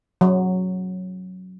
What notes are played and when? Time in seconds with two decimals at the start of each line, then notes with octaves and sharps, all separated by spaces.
0.21 F#3